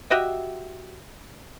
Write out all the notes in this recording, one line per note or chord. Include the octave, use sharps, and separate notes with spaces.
F#4 G4 D#5 E5